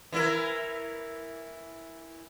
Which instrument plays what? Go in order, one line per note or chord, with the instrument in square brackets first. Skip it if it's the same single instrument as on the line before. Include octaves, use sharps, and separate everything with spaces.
[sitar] E3 E4 A#4